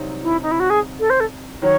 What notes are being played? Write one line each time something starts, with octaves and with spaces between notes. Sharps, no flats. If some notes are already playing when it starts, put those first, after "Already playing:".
Already playing: C2 C3 F#3 C4 D#4
E4
D#4
E4
F#4
G#4
A4
C5
A4
D#3 F#3 C#5